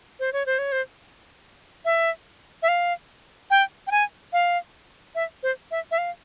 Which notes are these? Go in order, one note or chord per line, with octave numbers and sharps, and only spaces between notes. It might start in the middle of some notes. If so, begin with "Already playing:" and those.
C5
C#5
C5
C#5
C5
E5
E5
F5
G5
G5
G#5
F5
E5
C5
E5
E5
F5